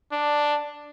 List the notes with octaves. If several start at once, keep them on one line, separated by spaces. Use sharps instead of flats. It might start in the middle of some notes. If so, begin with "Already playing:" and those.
D4